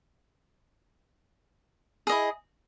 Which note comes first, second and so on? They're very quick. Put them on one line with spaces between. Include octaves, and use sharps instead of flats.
G#4 D#5 E4